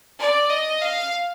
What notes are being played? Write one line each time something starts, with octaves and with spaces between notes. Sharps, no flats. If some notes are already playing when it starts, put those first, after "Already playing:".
D5
D#5
F5